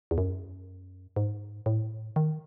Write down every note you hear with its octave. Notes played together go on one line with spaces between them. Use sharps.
E2
F#2
G#2
A2
D#3